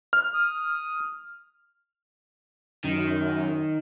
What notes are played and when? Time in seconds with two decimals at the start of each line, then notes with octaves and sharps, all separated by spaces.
0.13 F6
0.34 D#6
2.84 F#2 D#3